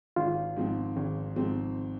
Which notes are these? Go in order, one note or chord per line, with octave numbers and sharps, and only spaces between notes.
G#1 F4
G#2 F3 C4
G#1
G#2 F3 C4